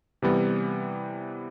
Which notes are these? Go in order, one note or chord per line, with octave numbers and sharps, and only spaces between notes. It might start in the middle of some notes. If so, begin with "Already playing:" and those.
C3 E3 G3 B3